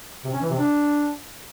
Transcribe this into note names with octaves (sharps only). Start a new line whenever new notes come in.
C3
C#4
E3
C3
D4